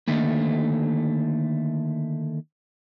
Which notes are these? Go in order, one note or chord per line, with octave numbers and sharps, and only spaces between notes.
D3 D#3 A3 A#3